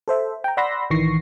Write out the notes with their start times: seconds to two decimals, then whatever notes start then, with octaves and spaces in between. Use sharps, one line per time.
0.08 A4 C5 E5
0.44 G5 A#5
0.57 D5 F#5 B5 C6 E6 A#6
0.90 A1 D#3 E3 C#6 A#6 C7